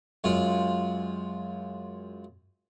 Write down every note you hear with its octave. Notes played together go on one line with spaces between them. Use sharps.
F#2 G#3 F4